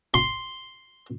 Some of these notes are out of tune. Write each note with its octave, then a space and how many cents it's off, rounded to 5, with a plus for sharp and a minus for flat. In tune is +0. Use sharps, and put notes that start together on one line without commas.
C6 +0